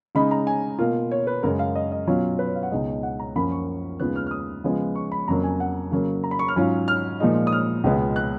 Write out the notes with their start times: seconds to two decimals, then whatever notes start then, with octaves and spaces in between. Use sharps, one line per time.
0.15 C#3 G#3 D#4 B5
0.31 A#5
0.47 G#5
0.79 B2 A#3 F4
1.12 C#5
1.27 B4
1.43 F#2 C#3 G#3 A#4
1.59 F5
1.75 D#5
1.92 D#5
2.07 B2 F#3 C#4 F4 C#5
2.39 B4
2.47 C#5
2.55 F5
2.63 F#5
2.71 C#2 B2 G#3 D#4
3.03 F#5
3.19 A#5
3.35 F#2 F3 A#3 C#4 F4 B5
3.52 C#6
3.99 D#2 C#3 G#3 B3 F4 F#6
4.16 F6
4.27 F6
4.31 D#6
4.64 C#3 F3 G#3 B3 F4
4.95 C#6
5.12 B5
5.28 F2 C#3 F#3 A#3 A#5
5.44 G#5
5.60 F#5
5.92 C#3 F#3 A#3
6.24 A#5
6.31 B5
6.39 C#6
6.48 F6
6.56 G#2 F#3 C#4 F4
6.88 F6
7.20 A#2 F3 G#3 D#4
7.47 D#6
7.52 F6
7.84 C#2 B2 G#3 B3 F4
8.16 F#6